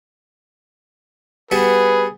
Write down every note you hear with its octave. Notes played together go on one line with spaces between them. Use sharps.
G3 B3 F#4 G#4 B4